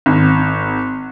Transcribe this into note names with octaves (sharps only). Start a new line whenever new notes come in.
G#1